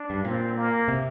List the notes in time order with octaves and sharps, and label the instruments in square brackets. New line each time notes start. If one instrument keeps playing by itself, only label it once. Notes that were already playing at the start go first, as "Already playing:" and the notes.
Already playing: [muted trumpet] D4
[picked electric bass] G2
[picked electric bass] A#2 [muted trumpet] C4
[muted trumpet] A#3
[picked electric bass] C3